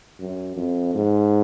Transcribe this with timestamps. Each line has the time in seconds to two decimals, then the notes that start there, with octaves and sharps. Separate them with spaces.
0.20 F#2
0.56 F2
0.94 G#2